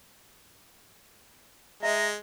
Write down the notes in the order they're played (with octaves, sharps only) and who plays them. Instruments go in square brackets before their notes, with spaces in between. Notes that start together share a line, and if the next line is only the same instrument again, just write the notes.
[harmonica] G#3 [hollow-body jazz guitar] D#5 E5 [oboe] A#5